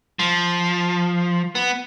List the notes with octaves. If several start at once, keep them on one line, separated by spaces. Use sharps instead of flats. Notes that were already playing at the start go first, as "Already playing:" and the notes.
F3
B3